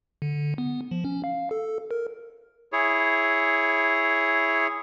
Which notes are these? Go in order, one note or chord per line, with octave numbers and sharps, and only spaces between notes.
D3
B3
F3
C#4
F5
A4
A#4
E4 G#4 C#5